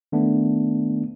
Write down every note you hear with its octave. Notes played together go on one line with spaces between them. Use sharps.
D#3 A3 B3 D4